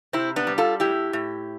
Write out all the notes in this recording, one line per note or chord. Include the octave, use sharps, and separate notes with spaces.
C3 C4 E4
B3 D4
G3
F4 A4
A2 E4 G4
A2